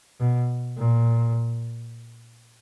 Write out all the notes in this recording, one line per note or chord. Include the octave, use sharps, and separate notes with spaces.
B2
A#2